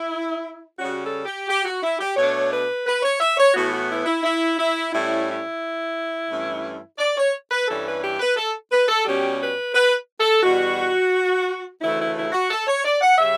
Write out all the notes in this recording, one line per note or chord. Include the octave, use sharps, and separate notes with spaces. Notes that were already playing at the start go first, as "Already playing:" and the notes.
Already playing: E4
C#3 G3 C#4 F#4
A4
G4
G4
F#4
E4
G4
B2 A3 D4 C#5
B4
B4
C#5
E5
C#5
A2 E3 B3 F#4
F#4
E4
E4
E4
E4
A2 G3 C#4 E4
E4
G2 E3 A3 C#4
D5
C#5
B4
G2 E3 G3 C#4 A4
B4
G4
B4
A4
B4
A4
B2 G3 C#4 G4
B4
B4
A4
E2 B2 G3 F#4
D2 C#3 E3 A3 E4
E4
E4
F#4
A4
C#5
D5
F#5
C#3 G3 E5